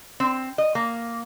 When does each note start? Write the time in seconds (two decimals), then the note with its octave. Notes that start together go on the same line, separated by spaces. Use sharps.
0.20 C4
0.58 D#5
0.75 A#3